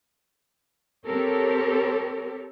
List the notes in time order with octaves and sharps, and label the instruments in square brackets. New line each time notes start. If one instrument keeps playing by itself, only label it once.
[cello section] C4 G4 A4 A#4 C#5